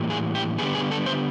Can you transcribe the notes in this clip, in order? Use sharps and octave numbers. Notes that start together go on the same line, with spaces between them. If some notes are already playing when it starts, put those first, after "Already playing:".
Already playing: A2 E3 G3 A#3
G#4
G4
D3 G3 B3 G#4
G#4
A4
C5